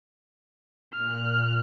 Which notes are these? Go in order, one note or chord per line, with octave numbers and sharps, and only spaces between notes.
A#2 F6 F#6